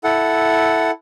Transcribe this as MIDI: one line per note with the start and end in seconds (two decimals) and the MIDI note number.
0.04 0.91 64
0.04 0.91 69
0.04 0.91 78